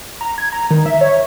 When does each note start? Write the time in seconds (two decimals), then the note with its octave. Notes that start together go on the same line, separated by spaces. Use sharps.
0.21 A#5
0.38 G#6
0.52 A#5
0.71 D#3
0.86 E5
1.01 C#5